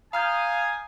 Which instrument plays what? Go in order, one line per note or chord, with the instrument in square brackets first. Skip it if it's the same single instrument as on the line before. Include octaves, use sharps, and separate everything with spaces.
[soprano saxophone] F5 [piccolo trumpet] G#5 [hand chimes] A#5 F6 G6 [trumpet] D#6